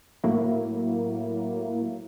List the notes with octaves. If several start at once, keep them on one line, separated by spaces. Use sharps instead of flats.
A2 F#3 A#3 E4